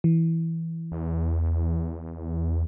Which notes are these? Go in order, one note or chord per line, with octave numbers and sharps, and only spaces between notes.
E3
E2